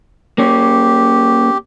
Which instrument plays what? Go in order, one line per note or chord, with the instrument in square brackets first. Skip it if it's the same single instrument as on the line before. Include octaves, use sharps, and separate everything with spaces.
[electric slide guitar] A#3 C#4 [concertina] G4